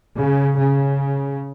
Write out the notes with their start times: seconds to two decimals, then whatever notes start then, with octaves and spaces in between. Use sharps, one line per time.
0.15 C#3
0.57 C#3